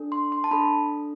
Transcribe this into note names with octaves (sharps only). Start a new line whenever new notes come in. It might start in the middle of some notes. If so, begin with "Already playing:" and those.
Already playing: D4 A4
C6
C6
A5
D4 A4 B5